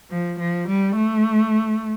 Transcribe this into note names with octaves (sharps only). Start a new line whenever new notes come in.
F3
F3
G3
A3